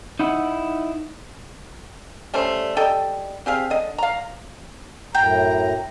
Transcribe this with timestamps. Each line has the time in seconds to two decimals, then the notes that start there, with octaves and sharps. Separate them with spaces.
0.19 D#4 E4 F#5
2.34 G3 A3 C#4 C5
2.77 G3 A4 D#5 G5
3.46 C4 G4 G#4 F5
3.70 D3 D#5
3.98 F5 A#5
5.15 F#2 A2 G5 A#5